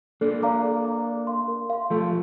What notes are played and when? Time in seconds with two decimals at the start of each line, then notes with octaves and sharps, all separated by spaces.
0.21 A#3 D4 A4
0.43 D5 F5 A#5 D6
0.64 A4
0.85 D5 F5 A#5 D6
1.06 A#4
1.27 F5 C6
1.48 A#4
1.70 F5 C6
1.90 F3 A3 A4